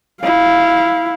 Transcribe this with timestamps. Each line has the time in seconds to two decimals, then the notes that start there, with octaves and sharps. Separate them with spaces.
0.21 E4 F5